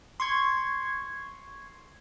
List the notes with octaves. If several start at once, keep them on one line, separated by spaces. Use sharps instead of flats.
C6 C#6 G#6